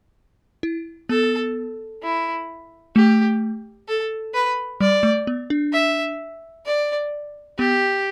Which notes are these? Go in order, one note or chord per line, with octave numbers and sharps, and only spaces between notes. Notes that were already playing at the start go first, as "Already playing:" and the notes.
E4
B3 A4
E4
A3 G4
A4
B4
G3 D5
A3
B3
D4
E5
D5
B3 G4